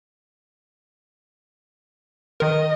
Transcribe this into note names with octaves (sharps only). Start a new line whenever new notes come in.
D#3 A#4 D#5